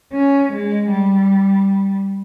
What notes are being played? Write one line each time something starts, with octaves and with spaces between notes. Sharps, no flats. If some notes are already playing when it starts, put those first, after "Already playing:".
C#4
G#3
G3